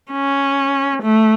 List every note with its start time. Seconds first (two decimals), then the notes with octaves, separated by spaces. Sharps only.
0.12 C#4
1.02 A3